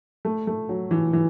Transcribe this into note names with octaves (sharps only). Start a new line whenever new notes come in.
A3
A3
F#3
E3
E3